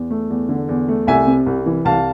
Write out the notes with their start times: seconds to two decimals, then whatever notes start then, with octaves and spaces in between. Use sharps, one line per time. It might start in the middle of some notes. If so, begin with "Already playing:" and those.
Already playing: E2
0.11 A3
0.30 E2
0.49 D3
0.69 E2
0.88 A3
1.07 C2 E5 G#5
1.27 C3
1.46 C2
1.66 E3
1.85 C2 F5 A5